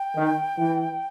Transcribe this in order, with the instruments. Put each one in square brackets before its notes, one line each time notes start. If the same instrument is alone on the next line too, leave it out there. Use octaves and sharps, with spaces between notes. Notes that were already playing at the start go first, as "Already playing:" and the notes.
Already playing: [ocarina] G5
[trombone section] D#3
E3